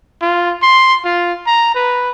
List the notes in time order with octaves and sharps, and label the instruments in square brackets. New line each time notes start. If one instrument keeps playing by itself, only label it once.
[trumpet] F4
C6
F4
A#5
B4